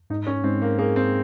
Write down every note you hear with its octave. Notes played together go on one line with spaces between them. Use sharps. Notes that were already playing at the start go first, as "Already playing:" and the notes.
G#2 D#4
C#4
G#2 C4
A#3
A#3 G#4
C4